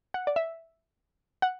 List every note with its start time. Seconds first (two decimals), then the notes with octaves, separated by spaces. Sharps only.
0.14 F#5
0.27 D5
0.36 E5
1.42 F#5